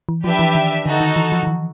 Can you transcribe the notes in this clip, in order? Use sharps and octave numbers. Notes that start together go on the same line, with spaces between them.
E3
F3 D4 G4 B4 E5
E3
D#3
D3 D#4 F#4 A4
D#3
E3
F3
D#3
E3